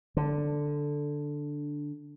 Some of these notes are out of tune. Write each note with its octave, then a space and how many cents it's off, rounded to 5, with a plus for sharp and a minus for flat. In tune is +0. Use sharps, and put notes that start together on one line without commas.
D3 +0